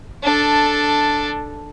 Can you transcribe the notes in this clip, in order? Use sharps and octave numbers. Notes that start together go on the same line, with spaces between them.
D4 A4